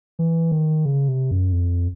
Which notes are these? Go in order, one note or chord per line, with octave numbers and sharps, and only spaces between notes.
E3
D#3
C#3
C3
F#2
F2